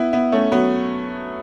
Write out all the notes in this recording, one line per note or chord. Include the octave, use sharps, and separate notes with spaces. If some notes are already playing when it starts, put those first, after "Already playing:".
Already playing: B3 E4
B3 E4
A3 C#4
F#3 B3